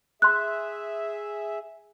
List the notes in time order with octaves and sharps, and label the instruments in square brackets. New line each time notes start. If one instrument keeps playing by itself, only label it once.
[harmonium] G#4 E5 [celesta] C6 F#6